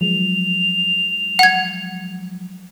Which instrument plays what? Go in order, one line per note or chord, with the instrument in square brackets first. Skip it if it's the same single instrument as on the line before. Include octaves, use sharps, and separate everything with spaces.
[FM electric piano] F3 F#3 G#3 [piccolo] F7
[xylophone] F#5 G#6